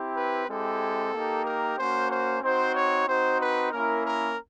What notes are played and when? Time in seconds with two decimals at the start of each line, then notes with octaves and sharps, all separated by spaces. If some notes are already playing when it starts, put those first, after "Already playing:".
Already playing: C4 E4 G4
0.16 B4
0.48 G#3 C4 E4 G4 A4
1.13 A#3 D#4 G4
1.45 A#4
1.77 A#3 C#4 F#4 C5
2.10 C5
2.42 C4 D#4 F#4 C5
2.74 C#5
3.07 C4 D#4 F#4 C5
3.39 B4
3.71 A#3 C#4 E4 A#4
4.04 A#4